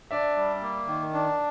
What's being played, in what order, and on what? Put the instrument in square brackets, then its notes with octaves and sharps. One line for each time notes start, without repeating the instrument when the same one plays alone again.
[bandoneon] D4 [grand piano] D5 E5
[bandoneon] G3
A#3
D#3
D4